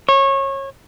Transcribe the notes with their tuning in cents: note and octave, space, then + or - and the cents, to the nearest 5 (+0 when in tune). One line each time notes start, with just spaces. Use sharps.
C#5 -25